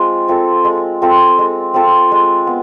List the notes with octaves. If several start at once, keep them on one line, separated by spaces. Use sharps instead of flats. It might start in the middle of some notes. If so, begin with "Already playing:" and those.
Already playing: G#3 C4 F4
C4 F4 A4
G#3
C4 F4 A4
G#3
C4 F4 A4
G#3
B3